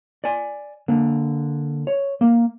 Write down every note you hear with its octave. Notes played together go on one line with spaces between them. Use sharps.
D5 G#5
D3 A#3
C#5
A#3